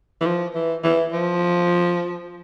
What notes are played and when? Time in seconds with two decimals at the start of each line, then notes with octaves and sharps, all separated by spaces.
0.21 E3
0.26 F3
0.55 E3
0.83 E3
1.13 F3